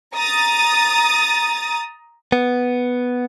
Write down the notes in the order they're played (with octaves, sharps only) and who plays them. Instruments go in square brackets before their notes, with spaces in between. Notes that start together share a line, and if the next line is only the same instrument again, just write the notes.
[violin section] A#5 D#6 A6
[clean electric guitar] B3